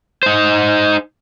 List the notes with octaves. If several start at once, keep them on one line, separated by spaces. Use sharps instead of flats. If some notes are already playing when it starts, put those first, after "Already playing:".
D#4 C5